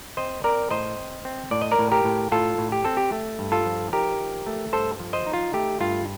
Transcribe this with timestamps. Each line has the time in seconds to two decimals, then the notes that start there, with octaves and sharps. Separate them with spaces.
0.17 C4 C5 D#5
0.44 C4 A#4 D5
0.71 A2 C5 D#5
0.98 C4
1.25 C4
1.51 A2 D5
1.61 D#5
1.71 A#4 D5
1.79 A2
1.92 G4 A#4
2.04 A2
2.32 A2 F4 A4
2.58 A2
2.72 G4
2.84 C4 A4
2.97 G4
3.12 A3
3.39 G2
3.52 F4 A4
3.66 F3
3.93 D#4 G4 A#4
4.20 F3
4.47 A3
4.73 G2 A4 C5
5.00 F3
5.13 C5 D#5
5.27 D#4
5.33 F4
5.53 A3 G4
5.80 G2 F4